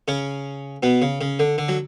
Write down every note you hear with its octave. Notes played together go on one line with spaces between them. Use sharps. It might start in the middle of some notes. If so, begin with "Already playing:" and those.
C#3 C#4
B2 B3
C#3
C#3
D3
D3
F#3